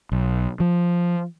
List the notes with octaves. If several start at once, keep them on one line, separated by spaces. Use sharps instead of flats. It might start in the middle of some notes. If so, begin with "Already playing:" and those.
B1
F3